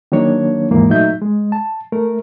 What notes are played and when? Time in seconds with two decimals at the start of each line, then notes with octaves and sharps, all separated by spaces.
0.12 D#3 F#3 A#3 D4 C#5
0.71 D#2 G#2 E3 G#3 A#3
0.90 A#2 F#3 A3 D#4 E5 G6
1.22 G#3
1.52 A5
1.92 A3 A#4